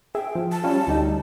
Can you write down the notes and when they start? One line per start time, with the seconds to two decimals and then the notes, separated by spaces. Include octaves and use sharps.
0.15 G#4 E5 G5
0.35 F3
0.52 A5
0.64 G3 C#4 F4
0.87 D2 G3 D#4